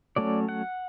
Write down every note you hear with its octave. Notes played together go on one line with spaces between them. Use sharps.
F#3 A3 C#4 D5
F#5